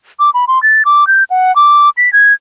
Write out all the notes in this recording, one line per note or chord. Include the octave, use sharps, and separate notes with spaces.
D6
B5
C6
A6
D6
G6
F#5
D6
B6
G#6